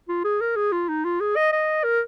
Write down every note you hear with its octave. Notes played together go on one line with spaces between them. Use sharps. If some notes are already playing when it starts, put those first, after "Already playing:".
F4
G#4
A#4
G#4
F4
D#4
F4
G#4
D#5
D#5
A#4